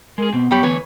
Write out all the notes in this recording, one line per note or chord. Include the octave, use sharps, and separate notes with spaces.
G#3 G#4 A#4
B2 B3 C4
F#2 G3 G4 C#5 B5
D2 E3 B4 C#5